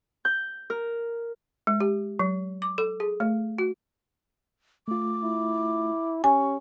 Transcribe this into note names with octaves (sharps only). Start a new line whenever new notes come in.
G6
A#4
G#3
G4
F#3
D6
A4
G#4
A3
F#4
A3 F4 D6
E4
C#4 G4 G#5 C#6